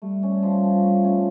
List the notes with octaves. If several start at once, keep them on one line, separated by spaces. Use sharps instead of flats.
G3 A3
C#4
F3
F3
A3
C#4